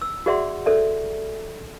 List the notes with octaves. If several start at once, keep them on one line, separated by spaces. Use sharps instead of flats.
E6
F#4 G#4 D5 E5 F#5 C6
A4 D5 E5